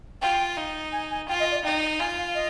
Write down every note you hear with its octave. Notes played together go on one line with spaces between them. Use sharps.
F4 G5
D#4
G#5
G#5
F4 G5
D#5
D5
D#4 G5
F4 G#5
F5
D#5